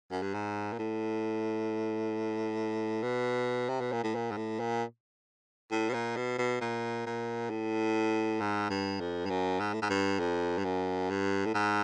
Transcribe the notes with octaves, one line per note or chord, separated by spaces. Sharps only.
F#2
G2
G#2
A#2
A2
B2
C3
B2
A#2
A2
A#2
G#2
A2
A#2
A2
B2
A#2
B2
B2
A#2
A#2
A2
G#2
G2
F2
G2
F#2
G#2
A2
G#2
G2
F2
G2
F#2
G2
A2
G#2